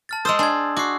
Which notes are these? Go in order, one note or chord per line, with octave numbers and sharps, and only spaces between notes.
A5 F6 A6
G#3 C5 D#6 E6
D4 G#5 G#6
F#4 D6 C7